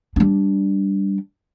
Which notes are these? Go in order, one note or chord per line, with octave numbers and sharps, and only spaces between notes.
G3 D4